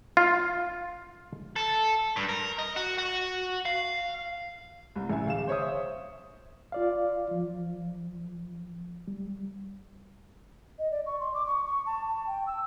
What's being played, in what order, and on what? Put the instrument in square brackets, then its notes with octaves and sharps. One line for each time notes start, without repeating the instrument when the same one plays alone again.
[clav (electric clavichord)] F4
[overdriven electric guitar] A4
G2
A#4
D#5
F#4
F#4
F5
[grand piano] C2
A1 E5 G#5
D1 F5 E7
C5 C#5 E5 D#6
[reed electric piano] F4 D5 F5
F3
G3
[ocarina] D#5
D5
C#6
C6
D6
C#6
C#6
A5
A5
G5
E6